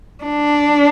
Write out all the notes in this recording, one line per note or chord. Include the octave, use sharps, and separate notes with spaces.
D4